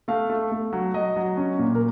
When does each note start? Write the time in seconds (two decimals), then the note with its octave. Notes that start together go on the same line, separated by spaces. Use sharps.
0.08 A3 F5
0.30 A3
0.51 A3
0.73 F#3
0.94 F#3 D#5
1.16 F#3
1.37 C#4
1.59 A#2
1.75 A#4